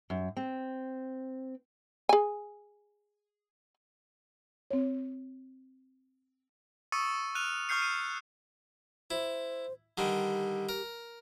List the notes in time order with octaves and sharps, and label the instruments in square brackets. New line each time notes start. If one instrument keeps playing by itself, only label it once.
[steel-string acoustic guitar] F#2
C4
[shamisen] G#4 G#5
[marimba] C4 C#5
[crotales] C#6 D#6 E6 A6 C#7 D#7
F6 F#6 D#7 F7
C#6 D#6 F6 G6 C7 C#7
D#7
[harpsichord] E4 [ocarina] C5
[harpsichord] D3 D#3 G3 [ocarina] G4
[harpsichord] A#4